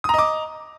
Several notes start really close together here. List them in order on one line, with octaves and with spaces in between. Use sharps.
D#6 A#5 D#5 D6